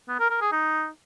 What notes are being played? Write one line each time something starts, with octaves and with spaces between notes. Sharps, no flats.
B3
A#4
A#4
G#4
D#4